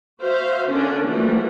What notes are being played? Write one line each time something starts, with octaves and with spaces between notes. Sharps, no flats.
F#4 C5 E5 F5
D3 C#4 D4 A#4
E3 F3 G3 A3 A#3 F#4